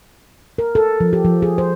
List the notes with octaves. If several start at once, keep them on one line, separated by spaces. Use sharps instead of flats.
A#4
A4
F3
G4
F3
G#4
C5